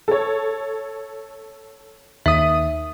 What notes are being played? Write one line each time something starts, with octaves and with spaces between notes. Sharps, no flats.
A4 C#5
D#2 E5 D#6 B6